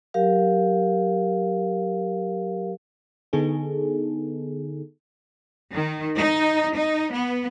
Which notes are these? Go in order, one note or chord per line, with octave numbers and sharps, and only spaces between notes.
F#3 G4 A#4 F5
D3 B3 D#4 G#4 A4
D#3
D#4
D#4
B3